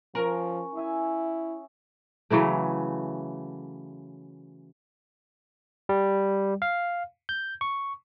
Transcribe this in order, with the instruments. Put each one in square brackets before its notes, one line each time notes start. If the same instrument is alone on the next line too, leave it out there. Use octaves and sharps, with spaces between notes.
[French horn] F3 [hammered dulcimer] C#4 C#5 [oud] A#4
[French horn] E4 [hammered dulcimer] G#4 E5 G#5
[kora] C#3 E3 F#3 A3
[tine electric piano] G3
F5
G6
C#6